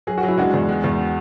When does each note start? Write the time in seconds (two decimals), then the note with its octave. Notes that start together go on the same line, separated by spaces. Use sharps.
0.07 F#3 G#4
0.18 F#4
0.23 F#3
0.28 E4
0.38 G#3 D4 F#4
0.54 E2
0.69 G#3
0.84 E2